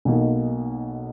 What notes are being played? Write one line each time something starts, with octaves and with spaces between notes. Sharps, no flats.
B1 B2 A#3 D#4